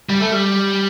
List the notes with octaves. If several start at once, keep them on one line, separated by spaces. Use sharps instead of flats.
G3
A3
G3